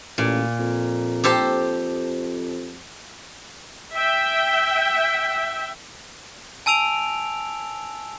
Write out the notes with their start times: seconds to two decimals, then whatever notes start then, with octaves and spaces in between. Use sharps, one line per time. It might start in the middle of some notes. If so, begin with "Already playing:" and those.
0.18 A1 A#2
0.59 F2
1.24 G4 A4 C5
3.91 E5 G5
6.66 G#5 A5 E6 D7 F7